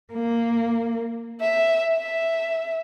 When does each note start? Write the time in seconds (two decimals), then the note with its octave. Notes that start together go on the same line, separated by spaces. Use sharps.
0.14 A#3
1.40 E5
1.95 E5